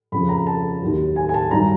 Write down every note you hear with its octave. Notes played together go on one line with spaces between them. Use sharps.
F2 C#3 F3 B5
A#5
A5
D#2 D#3 F#3
G#5
G#5
A5
G2 D#3 F#3 A#5